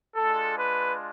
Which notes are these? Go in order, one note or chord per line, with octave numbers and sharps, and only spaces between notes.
G#3 D4 F4 A4
B4